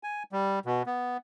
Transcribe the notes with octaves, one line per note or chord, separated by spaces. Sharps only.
G#5
G3
B2
B3